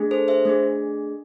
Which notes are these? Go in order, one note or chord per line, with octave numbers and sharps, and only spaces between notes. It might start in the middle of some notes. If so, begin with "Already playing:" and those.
Already playing: A3 D4 G#4
A4 C5
C5 E5
A3 D4 G#4